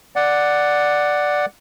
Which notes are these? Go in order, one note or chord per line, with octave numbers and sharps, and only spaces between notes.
D5 F#5